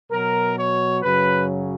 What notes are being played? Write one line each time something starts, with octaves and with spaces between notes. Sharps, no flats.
B2 F#3 A#4
C#5
F#2 C#3 F#3 B4